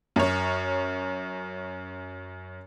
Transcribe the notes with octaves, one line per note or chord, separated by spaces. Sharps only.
F#2 C#5